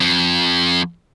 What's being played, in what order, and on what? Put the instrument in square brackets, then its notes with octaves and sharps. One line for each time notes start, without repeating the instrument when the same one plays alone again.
[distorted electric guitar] F2